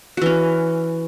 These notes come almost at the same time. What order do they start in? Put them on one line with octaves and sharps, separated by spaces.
F#4 E3 C#4